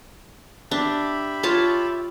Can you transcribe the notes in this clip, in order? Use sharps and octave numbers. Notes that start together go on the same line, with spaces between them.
D4 G4 E5 B5
F4 C#5 A5